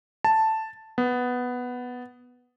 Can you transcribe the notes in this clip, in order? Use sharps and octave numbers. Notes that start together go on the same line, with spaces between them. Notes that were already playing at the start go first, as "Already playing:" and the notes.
A5
B3